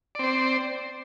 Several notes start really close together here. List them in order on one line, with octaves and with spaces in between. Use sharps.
D5 C4 C5